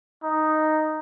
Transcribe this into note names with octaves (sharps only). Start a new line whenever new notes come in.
D#4